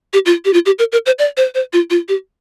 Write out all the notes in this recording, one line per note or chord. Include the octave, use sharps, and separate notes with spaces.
G4
F4
G4
F4
G4
A#4
A#4
C5
D5
C5
C5
F4
F4
G4